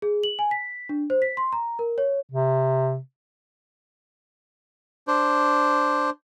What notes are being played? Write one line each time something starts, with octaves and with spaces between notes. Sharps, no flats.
G#4
F#7
G#5
B6
D4
C5
B6
C6
A#5
A#4
C#5
C3
D4 C5